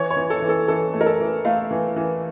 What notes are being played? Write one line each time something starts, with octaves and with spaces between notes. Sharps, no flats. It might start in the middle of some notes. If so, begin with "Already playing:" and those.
Already playing: E3 C#5
C#5
E3
A4
E3
A4
E3 A4
A3
A#4
A4
E3
A3 F5
E3
E3